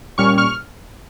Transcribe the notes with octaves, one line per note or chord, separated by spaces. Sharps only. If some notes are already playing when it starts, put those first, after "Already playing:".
A#2 G3 C#4 C#6 F6
C#6 F6